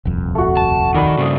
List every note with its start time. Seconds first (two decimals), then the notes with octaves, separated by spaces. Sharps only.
0.05 D#1 C2 F2
0.35 A3 F#4
0.57 A5
0.95 D#3 B4 D5 E6
1.18 G2 C#3 C5 D#6